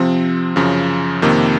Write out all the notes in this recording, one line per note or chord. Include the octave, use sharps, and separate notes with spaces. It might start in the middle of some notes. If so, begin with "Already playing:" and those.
Already playing: C3 F3 C4
F#2 C#3 F3
F2 C3 D#3 A#3